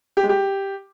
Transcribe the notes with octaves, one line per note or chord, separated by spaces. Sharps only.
G4
G#3
G4